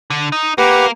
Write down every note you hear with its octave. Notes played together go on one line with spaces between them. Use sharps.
D3
D#4
A#3 G4 B4 F#5